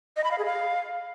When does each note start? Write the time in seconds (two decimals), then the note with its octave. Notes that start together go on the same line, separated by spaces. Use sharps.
0.17 D#5
0.24 B5
0.31 F5
0.38 G#4
0.46 F5